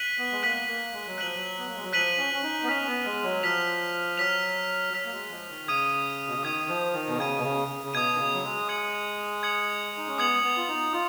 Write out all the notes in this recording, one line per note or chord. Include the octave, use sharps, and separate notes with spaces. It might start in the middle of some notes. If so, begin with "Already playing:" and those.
Already playing: F#6 B6 D#7 F#7
B3
G#3
A#3 F#6 B6 D#7 F#7
A#3
G#3
F#3
F3 F#6 B6 D#7 F#7
F#3
B3
A#3
G#3
F#3
F3 F#6 B6 D#7 F#7
C#4
C#4
D#4
B3
C#4 F6 B6 F7
B3
G#3
F#3
F3 F6 B6 F7
F#3 F6 B6 F7
F#3 F6 B6 F7
A#3
G#3
F3
D#3
C#3 D#6 G#6 D#7
B2
C#3
D#3 D#6 G#6 D#7
F3
D#3
B2
C#3 D#6 G#6 D#7
B2
C#3
C#3
C#3
B2 D#6 G#6 D#7
D#3
C#3
F#3
G#3
D#6 G#6 C#7 F#7
D#6 G#6 C#7 F#7
D#4
C#4
B3 D#6 G#6 C#7 F#7
B3
F4
D#4
F4 D#6